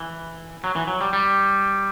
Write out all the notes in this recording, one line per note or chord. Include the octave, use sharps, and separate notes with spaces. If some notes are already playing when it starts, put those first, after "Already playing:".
Already playing: E3
F#3
E3
F#3
G3
G3